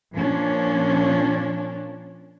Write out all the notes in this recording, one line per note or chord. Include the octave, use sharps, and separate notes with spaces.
A#2 F3 C#4 D4